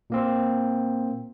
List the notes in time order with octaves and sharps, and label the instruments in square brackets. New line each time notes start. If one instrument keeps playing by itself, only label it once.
[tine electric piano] A#2 A#3 C4